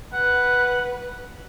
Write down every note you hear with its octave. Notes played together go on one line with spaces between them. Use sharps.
B4 F#5